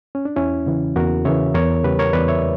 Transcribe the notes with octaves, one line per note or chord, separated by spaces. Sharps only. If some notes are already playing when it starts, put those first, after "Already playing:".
C#4
D4
E2 C#4 E4
C#3 E3
E2 F#4 A#4
C#3 E3 C#5 E5
E2 A#4 C#5
C#3 G3 G4 B4
A#4 C#5
E2 B4 D5
C#5 E5